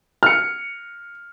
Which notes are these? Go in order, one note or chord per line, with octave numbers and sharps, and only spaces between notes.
F6 C#7